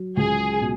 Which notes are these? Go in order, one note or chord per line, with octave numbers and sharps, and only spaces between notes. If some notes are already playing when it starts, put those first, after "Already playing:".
Already playing: F#3
C#2 G#4
B2